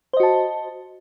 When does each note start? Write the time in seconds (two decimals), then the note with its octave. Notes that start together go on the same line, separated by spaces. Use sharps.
0.13 C5
0.17 D#5
0.20 F#4
0.23 A5